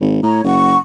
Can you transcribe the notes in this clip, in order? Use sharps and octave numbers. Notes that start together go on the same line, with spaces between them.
G#1
A2 C#5 A#5
F#1 F#5 C#6